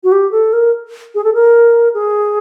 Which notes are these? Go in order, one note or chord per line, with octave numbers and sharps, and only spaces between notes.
F#4
G4
A4
A#4
G#4
A4
A#4
G#4